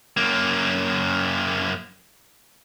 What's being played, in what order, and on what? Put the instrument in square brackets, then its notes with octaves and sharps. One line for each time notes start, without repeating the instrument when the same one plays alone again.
[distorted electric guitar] F#2 A#3